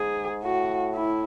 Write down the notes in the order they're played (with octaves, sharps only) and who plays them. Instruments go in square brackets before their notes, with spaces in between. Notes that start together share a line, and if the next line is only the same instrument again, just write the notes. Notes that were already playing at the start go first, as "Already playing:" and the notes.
Already playing: [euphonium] G#2 [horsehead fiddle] G#4
[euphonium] A2 [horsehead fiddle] F#4
[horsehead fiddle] E4